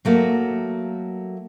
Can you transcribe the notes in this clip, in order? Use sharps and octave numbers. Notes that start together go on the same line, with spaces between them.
F#3 A3 A#3 F#4